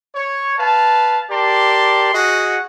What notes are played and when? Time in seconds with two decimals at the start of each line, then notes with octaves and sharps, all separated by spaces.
0.15 C#5
0.58 B4 F5 A5
1.31 G4 A#4 D5 A5 C6
2.14 F#4 G#4 D#5 F#5